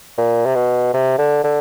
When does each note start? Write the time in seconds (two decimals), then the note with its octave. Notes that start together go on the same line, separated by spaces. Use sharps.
0.18 A#2
0.46 C3
0.55 B2
0.94 C3
1.18 D3
1.44 D3